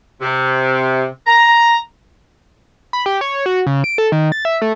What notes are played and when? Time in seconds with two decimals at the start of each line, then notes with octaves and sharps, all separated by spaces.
0.21 C3
1.26 A#5
2.93 B5
3.06 G4
3.21 C#5
3.46 F#4
3.67 C#3
3.84 D7
3.98 A4
4.12 D#3
4.32 A6
4.45 E5
4.62 A3